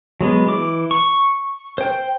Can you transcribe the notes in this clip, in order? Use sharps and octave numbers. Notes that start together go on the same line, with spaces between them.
F#3 G#3 B3
E3 D6
C#6
C5 G5